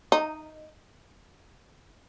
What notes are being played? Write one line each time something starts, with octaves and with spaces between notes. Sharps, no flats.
D#4